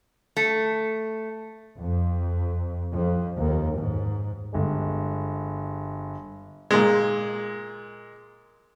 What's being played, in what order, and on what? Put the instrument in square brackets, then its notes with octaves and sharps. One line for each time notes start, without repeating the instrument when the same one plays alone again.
[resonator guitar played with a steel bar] A3
[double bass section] F2
F2
D#2
G#2
[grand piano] G1 G#3
[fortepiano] A#2 G#3